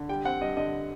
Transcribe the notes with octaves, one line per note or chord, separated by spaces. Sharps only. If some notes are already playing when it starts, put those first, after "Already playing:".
Already playing: D3
G3 G5
C4 F#5
G2 D#5
D3 D#5